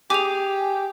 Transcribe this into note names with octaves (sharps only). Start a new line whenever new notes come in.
G4 G#4 D6 F7